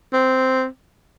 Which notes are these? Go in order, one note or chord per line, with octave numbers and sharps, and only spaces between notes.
C4